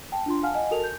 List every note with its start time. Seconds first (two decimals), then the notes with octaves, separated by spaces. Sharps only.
0.12 G5 A5
0.26 D4 F4 C6
0.43 F5 F#5 G#5 A5 F6
0.54 D#5 F#5 G#5
0.71 F#4 A4 A#4 A5 F7
0.84 G6